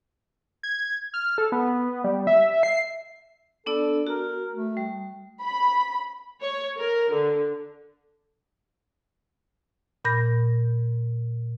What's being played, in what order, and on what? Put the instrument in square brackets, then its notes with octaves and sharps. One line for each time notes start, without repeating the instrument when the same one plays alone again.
[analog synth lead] G#6
F6
A4
B3
G3
E5
C7
[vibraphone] B3 D4 D5 [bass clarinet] A4
[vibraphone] F#4 [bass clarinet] A#4
[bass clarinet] A3
[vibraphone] G3
[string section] B5
[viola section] C#5
A#4
D3
[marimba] A#2 B5 G6 A#6